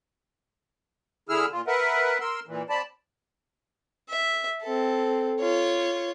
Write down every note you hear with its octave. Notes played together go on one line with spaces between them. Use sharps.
D3 E4 G#4 E6 F6
A#2 F4
A#4 B4 E5 F#5
A#4 C6 E6
A#2 E3
C4 D5 A5 B5
E5
C4 A4
F4 C#5